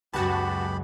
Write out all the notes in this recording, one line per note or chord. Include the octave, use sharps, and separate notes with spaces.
C#2 F#2 B3 F#4 G4 A5 B5